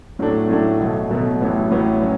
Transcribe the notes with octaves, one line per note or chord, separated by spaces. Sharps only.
A2 F#3 A3 D4
A2 F#3 A3 D4
B1 B2 F#3 A3
B1 B2 F#3 A3
A1 A2 F#3 B3
A1 A2 F#3 B3
F#3 C#4